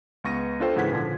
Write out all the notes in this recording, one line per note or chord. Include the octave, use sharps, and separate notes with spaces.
C#2 B3 C#6 A#6 D#7
D4 F4 A4 C5 G5
G#2 C#3 E3 F#5 G#6 B6
A#2 D3 F3